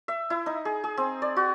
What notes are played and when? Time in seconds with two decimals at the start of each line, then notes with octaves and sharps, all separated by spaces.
0.08 E5
0.30 E4
0.46 D#4
0.65 G#4
0.84 G#4
0.97 C4
1.22 D5
1.36 F#4